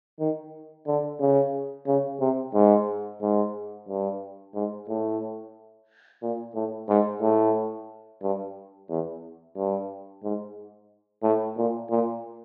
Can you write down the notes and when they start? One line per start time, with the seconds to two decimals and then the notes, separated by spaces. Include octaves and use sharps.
0.20 D#3
0.87 D3
1.20 C#3
1.87 C#3
2.20 C3
2.54 G#2
3.22 G#2
3.88 G2
4.55 G#2
4.88 A2
6.22 A#2
6.55 A2
6.89 G#2
7.21 A2
8.22 G2
8.89 E2
9.57 G2
10.23 G#2
11.23 A2
11.57 A#2
11.90 A#2